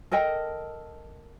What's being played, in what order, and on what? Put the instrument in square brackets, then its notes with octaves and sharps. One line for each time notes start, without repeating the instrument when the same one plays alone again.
[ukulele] A4 A#4 D#5 G5